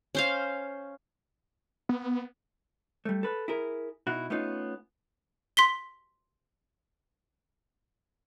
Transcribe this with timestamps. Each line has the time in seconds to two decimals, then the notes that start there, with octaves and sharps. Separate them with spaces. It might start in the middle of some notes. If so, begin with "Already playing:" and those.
0.15 C#4 C5 F5
1.89 B3
3.05 G3 A3
3.23 A4 B4
3.48 E4 G#4 A#4
4.07 B2 D#4 E4 F#4
4.30 A3 B3 C#4 D#4 F4
5.57 C6 B6 G7